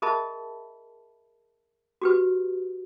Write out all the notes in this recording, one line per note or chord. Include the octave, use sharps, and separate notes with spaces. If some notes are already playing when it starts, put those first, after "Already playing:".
G#4 A#4 D#5 E5 A5 B5
F#4 G4 B4